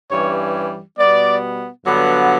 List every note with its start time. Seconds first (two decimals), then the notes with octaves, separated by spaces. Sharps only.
0.11 G2 E3 G3 C#4 C#5
0.98 B2 G3 B3 D5
1.85 G2 D3 F#3 B3